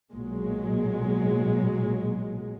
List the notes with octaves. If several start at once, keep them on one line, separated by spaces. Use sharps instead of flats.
B1 A#2 F#3 G#3